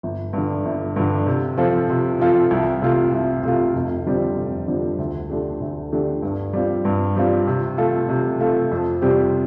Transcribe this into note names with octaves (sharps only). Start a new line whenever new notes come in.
G1
G2 D3
G1
G2 D3
C3
F3 C4 F4 A4
C3
F3 C4 F4 A4
C2
C3 A3 F4
C2
C3 A3 F4
F1
F2 D3 G3 C4
F1
F2 D3 G3 C4
D2
D3 A3 D4 G4
D2
D3 A3 D4 G4
G2
G3 C4 F4
G2
G3 C4 F4
C3
A3 F4 A4
C3
A3 F4 A4
F2
C3 G3 C4 G4